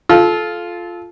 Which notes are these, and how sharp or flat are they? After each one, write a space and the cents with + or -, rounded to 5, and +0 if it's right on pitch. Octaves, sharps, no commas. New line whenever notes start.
F4 +0 A4 -25